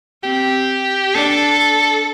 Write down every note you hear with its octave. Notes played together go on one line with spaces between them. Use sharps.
C4 G4
D4 A4